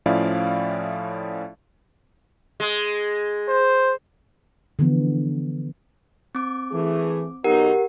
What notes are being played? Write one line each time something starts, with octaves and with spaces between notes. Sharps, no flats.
A2 F3 C#4 E4 D5 F5
G#3
C5
D3 E3 F3 B3
C4 D6
E3 A3 G#4
B1 D#4 G4 A#4 F#5